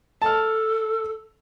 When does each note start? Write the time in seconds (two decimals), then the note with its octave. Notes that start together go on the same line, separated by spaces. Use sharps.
0.22 A4 A5 F6